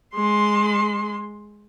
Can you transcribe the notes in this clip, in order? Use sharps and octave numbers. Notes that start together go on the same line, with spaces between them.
G#3 C6